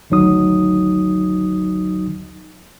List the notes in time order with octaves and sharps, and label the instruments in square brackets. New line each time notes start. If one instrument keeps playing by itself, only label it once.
[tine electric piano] G#1 D2 F#3 D#4 D#6